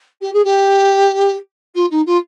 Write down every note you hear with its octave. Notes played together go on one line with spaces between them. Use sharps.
G4
G#4
G4
F4
D#4
F4